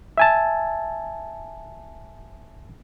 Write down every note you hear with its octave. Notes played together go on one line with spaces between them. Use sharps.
E5 G#5 A5